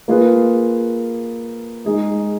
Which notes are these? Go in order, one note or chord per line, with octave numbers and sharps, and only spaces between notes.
A#3 F4 G#4 B4
G#3 D#4 G#4